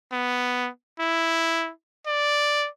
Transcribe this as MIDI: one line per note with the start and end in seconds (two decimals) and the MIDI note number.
0.12 0.69 59
1.00 1.71 64
2.06 2.68 74